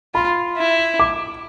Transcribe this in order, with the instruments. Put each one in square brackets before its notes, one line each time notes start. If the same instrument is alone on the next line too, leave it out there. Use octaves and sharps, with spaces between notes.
[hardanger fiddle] F4 [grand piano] B5
[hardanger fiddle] E4
[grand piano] D6